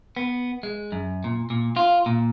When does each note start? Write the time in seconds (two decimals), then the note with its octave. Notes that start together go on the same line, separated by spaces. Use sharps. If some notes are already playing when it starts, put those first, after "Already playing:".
0.17 B3
0.63 G#3
0.92 F#2
1.24 A#2
1.50 A#2
1.77 F4
2.06 A#2